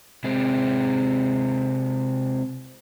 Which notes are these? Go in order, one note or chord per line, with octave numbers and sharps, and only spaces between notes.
C3 G#3 C4